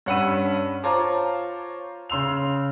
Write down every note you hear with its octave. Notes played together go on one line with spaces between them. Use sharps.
G2 C#4 F#5 B5 E6 D#7
F4 C5 C#5 A5 A#5 D6
C#3 C6 E6 F7